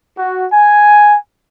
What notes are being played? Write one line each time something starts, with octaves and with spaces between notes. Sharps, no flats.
F#4
G#5